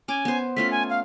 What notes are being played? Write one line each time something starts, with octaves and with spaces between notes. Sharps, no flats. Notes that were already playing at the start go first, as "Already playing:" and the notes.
C#4 G#5 D6
B3 C5
A3 C#4 F4 B6
G#5
F5